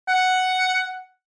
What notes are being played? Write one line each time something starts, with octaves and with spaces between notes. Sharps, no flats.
F#5